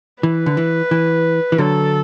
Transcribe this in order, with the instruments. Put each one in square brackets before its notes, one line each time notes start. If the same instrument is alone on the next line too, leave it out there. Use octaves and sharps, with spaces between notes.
[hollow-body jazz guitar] E3 [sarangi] B4
[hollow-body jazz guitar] D3
E3
E3
E3
[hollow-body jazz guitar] D3 F#3 [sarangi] A4